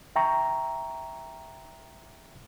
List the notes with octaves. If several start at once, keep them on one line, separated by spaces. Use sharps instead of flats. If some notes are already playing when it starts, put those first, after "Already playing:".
E5 G5 A#5 C#6